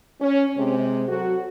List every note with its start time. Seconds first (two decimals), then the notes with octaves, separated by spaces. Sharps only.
0.21 C#4
0.56 C3 G#3 C4
1.08 F#3 F#4 A4